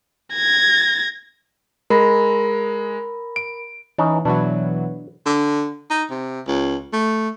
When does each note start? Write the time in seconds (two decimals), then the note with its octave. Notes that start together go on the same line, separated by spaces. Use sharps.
0.34 G#6 A#6
1.90 G#3 A#4 B5 A#6
3.36 D7
3.98 E3 C#4 D#4
4.25 B2 E3 F#3 D4
5.26 D3
5.90 D#4
6.11 C3
6.47 C#2
6.93 A3